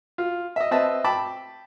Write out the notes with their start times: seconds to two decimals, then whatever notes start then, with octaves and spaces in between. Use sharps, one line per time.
0.18 F4
0.56 D#5 E5
0.71 C4 B4 D#5 E5 A5
1.04 G5 A5 B5 D6